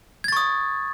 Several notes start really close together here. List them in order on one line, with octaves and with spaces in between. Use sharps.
G#6 A6 C#6 D#6